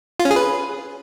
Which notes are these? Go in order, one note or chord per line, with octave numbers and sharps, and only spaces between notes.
F4
C#4
G#4
B4